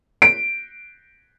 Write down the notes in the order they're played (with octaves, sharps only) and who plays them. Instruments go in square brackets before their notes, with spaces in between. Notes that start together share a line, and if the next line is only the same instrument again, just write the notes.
[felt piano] D7